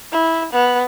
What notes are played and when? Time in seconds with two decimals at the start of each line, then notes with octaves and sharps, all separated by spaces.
0.13 E4
0.53 B3